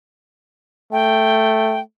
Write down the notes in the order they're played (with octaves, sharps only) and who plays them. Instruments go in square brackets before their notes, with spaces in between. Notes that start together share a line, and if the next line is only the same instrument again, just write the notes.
[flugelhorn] A3 [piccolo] G5